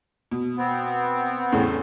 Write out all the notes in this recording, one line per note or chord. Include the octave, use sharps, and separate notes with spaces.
B2
B3 C4
E2 A2 C#3